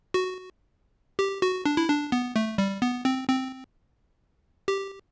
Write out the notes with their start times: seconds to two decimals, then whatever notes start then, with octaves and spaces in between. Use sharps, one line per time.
0.14 F#4
1.19 G4
1.42 F#4
1.66 D4
1.77 E4
1.88 D4
2.12 B3
2.36 A3
2.58 G3
2.82 B3
3.05 C4
3.28 C4
4.68 G4